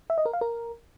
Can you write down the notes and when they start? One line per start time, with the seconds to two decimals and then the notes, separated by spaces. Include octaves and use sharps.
0.10 E5
0.18 D#5
0.26 A#4
0.33 F5
0.41 A#4